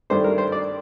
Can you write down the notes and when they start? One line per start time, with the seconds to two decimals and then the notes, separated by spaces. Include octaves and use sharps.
0.10 G2 D#3 A3 D4 C5
0.24 A#4
0.38 C5
0.52 D5